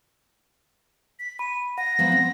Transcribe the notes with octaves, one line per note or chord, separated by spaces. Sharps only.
B6
B5 D#7
F#5 A#6
F3 F#3 B3
C4